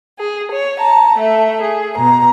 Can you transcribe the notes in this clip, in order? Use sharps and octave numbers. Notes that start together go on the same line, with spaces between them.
G#4
C#5
A5 A#5
A3 E5
G#4
B2 A#5